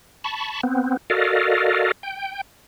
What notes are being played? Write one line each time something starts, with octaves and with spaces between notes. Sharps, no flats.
A5 B5 C#6
B3 C4
F#4 A4 A#4 D5 D#5 F5
G5